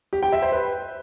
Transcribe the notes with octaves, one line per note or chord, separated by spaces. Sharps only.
G4
G5
E5
C5
B4